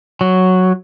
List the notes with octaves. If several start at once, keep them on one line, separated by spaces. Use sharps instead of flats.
F#3